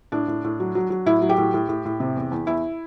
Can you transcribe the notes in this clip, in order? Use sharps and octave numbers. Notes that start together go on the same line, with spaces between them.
A2 D4
A2
A2
F#3
F#3
F#3
A2 E4
F#3
G4
A2
A2
A2
A2
C3
E2
E2
E2 E4